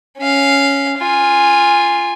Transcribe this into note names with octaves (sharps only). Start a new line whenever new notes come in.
C#4 F5
F4 G#5